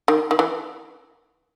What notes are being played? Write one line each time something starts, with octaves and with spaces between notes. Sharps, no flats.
D#3
D#3
E3